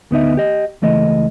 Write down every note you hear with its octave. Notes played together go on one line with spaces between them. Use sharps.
D2 B3 D#4 E5
G4 D#5
C#2 E3 A3 D#5